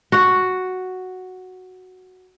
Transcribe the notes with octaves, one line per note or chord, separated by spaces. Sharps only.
F#4 F#5